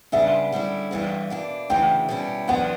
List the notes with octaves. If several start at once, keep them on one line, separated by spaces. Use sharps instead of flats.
C#3 G3 B3 D4 E5
D3 G3 C#4 E4
G2 E3 G3 B3
B2 A#3 D4
D2 C#3 E3 G5
B2 G3 C#4 E4
F#2 E3 B3 D4 F#5